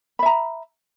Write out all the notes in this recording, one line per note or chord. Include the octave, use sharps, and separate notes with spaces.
E5 A#5 B5